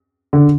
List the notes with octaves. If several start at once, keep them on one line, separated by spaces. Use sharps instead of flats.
D3